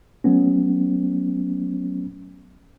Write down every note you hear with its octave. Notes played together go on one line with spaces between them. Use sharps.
F#3 A3 B3 C#4